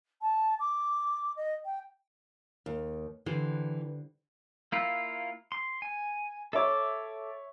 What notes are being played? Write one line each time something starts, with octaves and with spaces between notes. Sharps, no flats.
A5
D6
D#5
G5
D#2
D3 E3 G3 C5
A#3 E4 F4
C6
G#5
A4 C#5 E5 D6